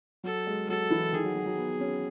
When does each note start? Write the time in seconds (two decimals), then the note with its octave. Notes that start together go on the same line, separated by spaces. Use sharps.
0.24 F#3 A4
0.47 G#3
0.69 F#3 A4
0.90 E3
1.12 D#3 G#4
1.24 F#3
1.35 F#3
1.46 F#3
1.57 B3
1.80 C#4